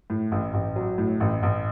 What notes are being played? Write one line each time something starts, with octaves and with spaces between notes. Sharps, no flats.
A2
A1
A1
F#3
A2
A1
A1